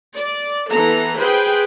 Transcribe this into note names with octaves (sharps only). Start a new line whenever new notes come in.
D5
E3 B3 A4 A#5
G#4 B4 C5 G5